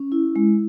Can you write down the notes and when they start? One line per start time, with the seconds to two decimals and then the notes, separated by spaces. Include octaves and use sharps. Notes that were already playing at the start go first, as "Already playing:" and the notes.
Already playing: C#4
0.12 E4
0.36 G#3